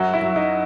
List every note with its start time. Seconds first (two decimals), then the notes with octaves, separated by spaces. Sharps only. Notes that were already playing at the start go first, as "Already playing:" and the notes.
Already playing: F#2 F#3 F#4
0.14 E4
0.21 F#3
0.36 D#4